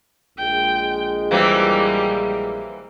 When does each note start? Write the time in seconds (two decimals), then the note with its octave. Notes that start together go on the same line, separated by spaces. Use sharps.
0.38 A#1 G#3 G5
1.31 E3 G3 A#3 C4